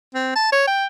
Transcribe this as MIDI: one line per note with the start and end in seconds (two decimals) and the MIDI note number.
0.15 0.31 60
0.35 0.48 81
0.52 0.63 73
0.67 0.86 79